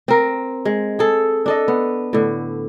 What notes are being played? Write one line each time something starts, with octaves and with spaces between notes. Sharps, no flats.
C4 A#4
G#3
G#4 A4
D4 A4 D#5
B3
A2 D3